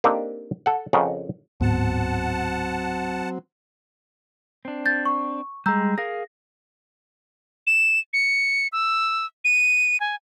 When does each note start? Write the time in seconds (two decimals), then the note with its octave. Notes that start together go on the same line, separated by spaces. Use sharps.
0.04 A#3 C4 D4 D#4 G4 A4
0.66 A4 F#5
0.93 F2 C#3 A#4 D#5 F#5
1.61 D1 G#2 F#3 B3 C4 F#5 A5
4.65 C4 D4
4.86 G6 A6
5.05 C#6
5.66 G3 G#3 A#5 E6 G6
5.98 G#4 A#4 F5 A#6
7.67 E7
8.13 C#7
8.72 E6
9.45 D#7
10.00 G#5